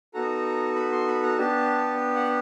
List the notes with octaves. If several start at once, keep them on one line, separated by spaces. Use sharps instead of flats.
B3 D#4 F#4 A4 A#5
B5
C6
B5
A#5
B3 D4 G4 A5
F#5